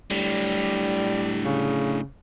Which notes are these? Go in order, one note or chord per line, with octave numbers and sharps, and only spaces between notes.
A2 D3 G3
C#3